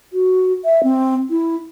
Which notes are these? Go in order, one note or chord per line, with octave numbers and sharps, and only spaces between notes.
F#4
E5
C4
E4